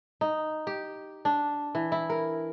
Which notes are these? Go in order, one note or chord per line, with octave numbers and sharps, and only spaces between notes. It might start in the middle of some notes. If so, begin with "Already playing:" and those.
D#4
G4
D4
E3
E4
A#4